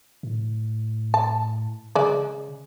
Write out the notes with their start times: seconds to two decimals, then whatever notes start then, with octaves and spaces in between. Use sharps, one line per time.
0.23 A2
1.14 A5
1.95 C#3 G#3 D5